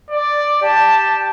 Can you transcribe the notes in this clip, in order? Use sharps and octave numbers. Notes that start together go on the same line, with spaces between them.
D5
G4 A5